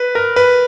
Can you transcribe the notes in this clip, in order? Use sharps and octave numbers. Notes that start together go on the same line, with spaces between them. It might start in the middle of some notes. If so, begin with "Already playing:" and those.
Already playing: B4
A#4
B4